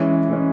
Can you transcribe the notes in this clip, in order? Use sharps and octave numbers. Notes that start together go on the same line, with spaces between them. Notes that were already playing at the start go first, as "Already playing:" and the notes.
Already playing: E3 G#3 C#4
E3 G#3 C#4